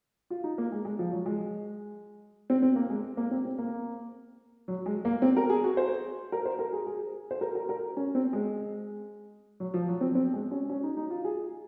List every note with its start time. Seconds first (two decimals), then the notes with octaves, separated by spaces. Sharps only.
0.30 F4
0.44 D#4
0.58 A#3
0.72 G#3
0.85 G#3
0.99 F3
1.12 F#3
1.26 G#3
2.50 C4
2.62 C4
2.76 A#3
2.90 G#3
3.17 A#3
3.31 C4
3.45 C4
3.58 A#3
4.68 F#3
4.86 G#3
5.05 A#3
5.22 C4
5.37 A#4
5.50 G#4
5.64 F#4
5.77 C5
6.32 A#4
6.45 C5
6.59 A#4
6.73 G#4
6.87 G#4
7.31 C5
7.41 A#4
7.55 A#4
7.69 A#4
7.97 C#4
8.15 C4
8.33 G#3
9.60 F#3
9.74 F3
9.88 F#3
10.01 C4
10.15 C4
10.33 G#3
10.51 C#4
10.70 C#4
10.83 D#4
10.97 D#4
11.10 F4
11.25 G#4